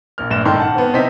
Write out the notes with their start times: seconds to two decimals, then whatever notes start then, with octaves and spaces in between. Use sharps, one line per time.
0.18 A#1 A#3 F6
0.30 A#1 G2 A3 E7
0.45 G#2 D#3 A4 C6
0.60 F#5 A5
0.75 B3 C4
0.93 C3 C4 D#4 B6